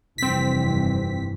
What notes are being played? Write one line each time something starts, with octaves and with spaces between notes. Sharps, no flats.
F1 G2 E3 C4 B6